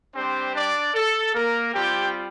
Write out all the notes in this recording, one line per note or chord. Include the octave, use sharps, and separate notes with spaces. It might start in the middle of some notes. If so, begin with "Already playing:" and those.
G3 C4 D4 G4 C5
D4 D5
A4
A#3 A#4
G3 C4 F4 G4 G5